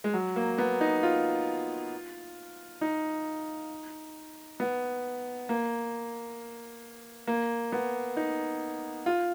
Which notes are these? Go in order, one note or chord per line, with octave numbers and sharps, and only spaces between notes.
G#3
F#3
A#3
B3
D#4
F4
D#4
B3
A#3
A#3
B3
D#4
F4